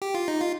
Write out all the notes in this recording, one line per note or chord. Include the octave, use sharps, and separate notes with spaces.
G4
F4
D#4
F4